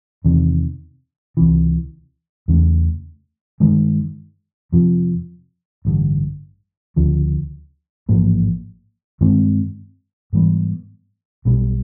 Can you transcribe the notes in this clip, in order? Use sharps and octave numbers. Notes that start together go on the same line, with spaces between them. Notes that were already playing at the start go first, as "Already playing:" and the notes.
E2 C3 D#3
C#2 C3 E3
E2 C#3 F#3 A3
G2 D#3 G#3
F2 C3 F3
A1 G2 D3
D2 C#3 F3
A1 G#2 F3 A#3
G2 D#3 G#3 C4
G#2 E3 G3 B3
B1 B2 G3